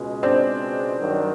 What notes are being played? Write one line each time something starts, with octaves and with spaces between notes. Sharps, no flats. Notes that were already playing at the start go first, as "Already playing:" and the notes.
Already playing: C#2 B2 G#3
C4 D4
G2 D#3 F#3